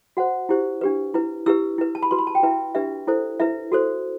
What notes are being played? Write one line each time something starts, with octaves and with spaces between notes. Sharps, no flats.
F#4 C5 F#5
E4 G4 C5
D4 G4 B4
E4 B4
E4 G4 B4 E6
E4 B4
A5
B5
F#4 B4 C6
B5
A5
G5
E4 B4 E5
D4 G4 B4 E5
E4 A4 C5
E4 B4 E5
F#4 A4 C5